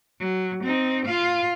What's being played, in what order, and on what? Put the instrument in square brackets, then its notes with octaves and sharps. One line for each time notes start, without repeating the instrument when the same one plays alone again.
[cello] F#3
C4 D#4
F4 F5